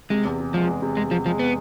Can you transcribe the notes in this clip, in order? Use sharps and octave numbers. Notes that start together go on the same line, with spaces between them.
C3 G#3
E2
C3
F3 G#3
E2
C3
E2 G#3
C3 F3
F3 G#3
B3